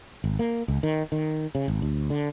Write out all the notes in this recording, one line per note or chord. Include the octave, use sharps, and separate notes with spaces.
G#1
A#3
C#2
D#3
D#3
C#3
G#1
D2
D3